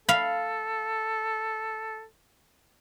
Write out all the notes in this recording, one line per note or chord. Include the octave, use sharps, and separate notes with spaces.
A4 F5 B5